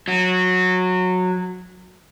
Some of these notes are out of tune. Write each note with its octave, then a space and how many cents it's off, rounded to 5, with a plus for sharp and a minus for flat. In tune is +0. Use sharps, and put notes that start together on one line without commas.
F#3 -15